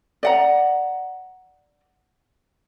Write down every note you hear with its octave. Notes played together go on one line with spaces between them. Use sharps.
D5 F#5 A#5